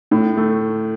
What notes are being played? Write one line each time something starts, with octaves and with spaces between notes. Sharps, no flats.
A2
A3